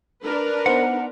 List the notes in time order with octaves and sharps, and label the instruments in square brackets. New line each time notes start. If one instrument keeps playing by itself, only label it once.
[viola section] D4 A#4 B4
[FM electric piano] B3 D#4 C5 [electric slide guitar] F#5